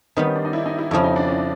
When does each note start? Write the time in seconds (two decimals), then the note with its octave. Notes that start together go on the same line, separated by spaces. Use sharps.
0.17 D#3 G3 B3 C4
0.26 C#4
0.36 D4
0.45 D#4
0.53 E4
0.66 D#4
0.79 E4
0.91 F2 C#3 F3 E4
1.04 D#4
1.16 D4
1.28 C#4